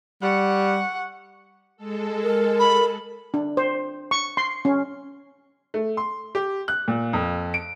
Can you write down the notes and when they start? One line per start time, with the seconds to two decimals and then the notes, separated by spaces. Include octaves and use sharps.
0.22 G3 F#5 C#6
1.77 G#3 A4
2.23 A#4
2.59 B5
3.34 D4
3.57 C5
4.11 C#6
4.37 C6
4.65 C#4
5.74 A3
5.97 C6
6.35 G4
6.68 F#6
6.88 A#2
7.13 F2
7.54 D7